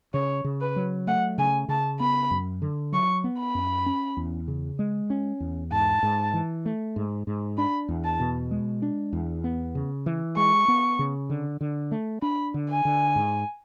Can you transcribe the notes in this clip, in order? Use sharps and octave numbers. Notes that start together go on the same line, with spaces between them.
C#3 C#5
C#3
B4
F#3
A3 F#5
C#3 G#5
C#3 A5
B3 B5
F#2
D3
F#3 C#6
B3
B5
F#2
C#4
E2
C#3
G#3
C#4
E2
G#2 A5
G#2
E3
A3
G#2
G#2
D4 B5
E2
A5
B2
G#3
D4
E2
B3
C#3
E3
G#3 C#6
B3
C#3
D3
D3
A3
D4 B5
D3
G#5
D3
G#2